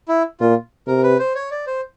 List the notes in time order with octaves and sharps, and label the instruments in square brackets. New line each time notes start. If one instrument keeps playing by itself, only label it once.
[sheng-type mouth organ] E4
[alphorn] A#2 [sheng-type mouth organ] F4
[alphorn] C3 [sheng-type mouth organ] A#4
[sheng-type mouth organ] B4
C5
C#5
D5
C5